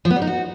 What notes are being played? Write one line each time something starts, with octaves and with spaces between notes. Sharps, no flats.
F3
B3
G3
D#4
F#4